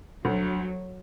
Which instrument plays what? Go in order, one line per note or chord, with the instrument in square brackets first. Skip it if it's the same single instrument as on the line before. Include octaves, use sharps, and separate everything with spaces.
[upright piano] D2 [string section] F#3